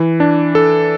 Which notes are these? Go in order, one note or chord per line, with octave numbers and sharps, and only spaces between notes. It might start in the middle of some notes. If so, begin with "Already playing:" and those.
Already playing: E3
D4
A4